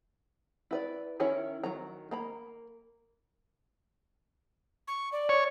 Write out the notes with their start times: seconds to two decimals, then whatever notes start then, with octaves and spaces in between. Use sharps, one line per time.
0.71 E4 B4 D5
1.20 D#3 C#4 E4 A#4 C#5
1.64 D#3 F#3 A#5
2.11 A#3 A#5 B5
4.88 C#6
5.12 D5
5.29 C#5